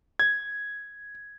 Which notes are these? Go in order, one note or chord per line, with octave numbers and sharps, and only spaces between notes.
G#6